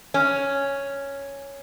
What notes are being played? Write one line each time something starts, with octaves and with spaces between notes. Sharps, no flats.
C#4